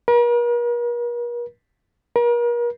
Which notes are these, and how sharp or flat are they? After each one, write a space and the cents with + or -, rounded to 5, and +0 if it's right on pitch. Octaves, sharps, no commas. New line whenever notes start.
A#4 +45
A#4 +40